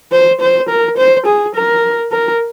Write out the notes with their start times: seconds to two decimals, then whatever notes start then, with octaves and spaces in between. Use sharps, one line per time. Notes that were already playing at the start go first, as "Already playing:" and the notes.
0.12 C5
0.41 C5
0.69 A#4
0.98 C5
1.26 G#4
1.55 A#4
2.12 A#4